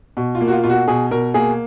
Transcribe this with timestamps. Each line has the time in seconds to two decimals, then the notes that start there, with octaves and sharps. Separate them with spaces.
0.17 B2
0.35 F4
0.41 A#3
0.48 F#4
0.52 F4
0.64 B2 F4
0.70 F#4
0.88 B2 G#4
1.11 B2 A#4
1.34 A#3 G#4